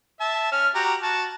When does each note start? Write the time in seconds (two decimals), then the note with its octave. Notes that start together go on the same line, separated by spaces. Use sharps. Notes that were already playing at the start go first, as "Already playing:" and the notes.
0.20 E5 A5
0.52 C#4 F6
0.75 F#4 G4 A#5
1.03 F#4 A5